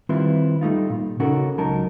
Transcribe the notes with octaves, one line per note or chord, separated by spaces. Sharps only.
D#3 G3 C4 E4 F4 B4
G3 A3 D#4 F4
A#2
C#3 C#4 D#4 F#4 A4 A#4
C#2 F#3 D#4 A#4 A5